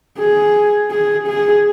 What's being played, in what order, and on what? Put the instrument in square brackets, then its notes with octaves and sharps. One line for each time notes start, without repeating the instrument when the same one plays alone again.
[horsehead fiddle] G#4
G#4
G#4